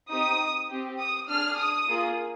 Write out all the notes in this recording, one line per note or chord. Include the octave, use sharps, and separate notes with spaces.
C4 D#4 G4 D#6
C4 G4
D#6
D4 G#4 F6
D#6
A#3 F4 G#4